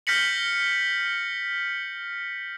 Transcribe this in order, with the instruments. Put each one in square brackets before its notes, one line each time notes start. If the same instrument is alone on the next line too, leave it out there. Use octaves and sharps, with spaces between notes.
[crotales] F6 G6 A#6 B6 C#7 F#7